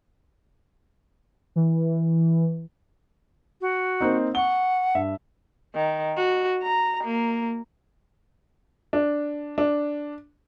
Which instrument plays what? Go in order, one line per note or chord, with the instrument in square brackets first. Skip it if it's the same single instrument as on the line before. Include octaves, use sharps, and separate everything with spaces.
[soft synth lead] E3
[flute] F#4
[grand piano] A#3 C4 D#4
[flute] F#5 [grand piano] C#6 G7
[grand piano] G2 E5
[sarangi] D#3
F#4
A#5
A#3
[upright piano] D4
D4